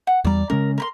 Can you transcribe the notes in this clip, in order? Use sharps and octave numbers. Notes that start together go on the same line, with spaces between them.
F#5
E2 G3 D5 A#5
C#3 G#3 C#4 A#4
A#4 B5 C6